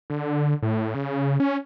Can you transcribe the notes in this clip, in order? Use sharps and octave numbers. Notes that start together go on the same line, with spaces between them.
D3
A2
C#3
C#4